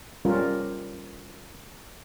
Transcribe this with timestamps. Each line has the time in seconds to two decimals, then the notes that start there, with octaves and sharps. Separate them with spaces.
0.25 G3 C#4 F4 A#4